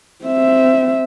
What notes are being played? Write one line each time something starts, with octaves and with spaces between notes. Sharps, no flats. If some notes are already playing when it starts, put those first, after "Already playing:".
C4 E5